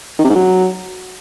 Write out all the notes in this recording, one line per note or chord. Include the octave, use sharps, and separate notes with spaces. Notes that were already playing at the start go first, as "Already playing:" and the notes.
D#3
C3
G#2
F#3